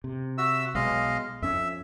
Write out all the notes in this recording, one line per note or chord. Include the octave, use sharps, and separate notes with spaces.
C3
F#4 E5 E6
B1 B2 G#3 D#5 F5
F2 C#4 E5